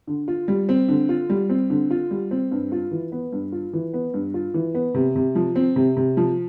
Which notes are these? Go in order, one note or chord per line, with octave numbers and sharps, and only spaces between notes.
D3
F4
G3
C4
D3
F4
G3
C4
D3
F4
G3
C4
G2
F4
E3
B3
G2
F4
E3
B3
G2
F4
E3
B3
C3
C3
F3
C4
C3
C3
F3